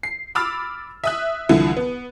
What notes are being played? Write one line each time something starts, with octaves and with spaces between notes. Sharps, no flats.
C7
B5 D6 E6 F6 A6
E5 D#6 F#6
C2 D3 E3 F3
B3